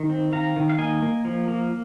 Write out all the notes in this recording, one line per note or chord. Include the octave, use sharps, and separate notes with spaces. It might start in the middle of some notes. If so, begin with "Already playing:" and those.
Already playing: D#3
C4
D#3 F5 A#5
D#3
F5
A#3 D#5 G#5
A#3
F3
A#3